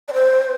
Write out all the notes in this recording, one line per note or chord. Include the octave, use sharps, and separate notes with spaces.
D5
C5